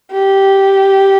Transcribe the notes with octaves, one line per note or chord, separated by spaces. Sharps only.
G4